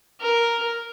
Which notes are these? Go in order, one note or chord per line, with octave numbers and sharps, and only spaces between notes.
A#4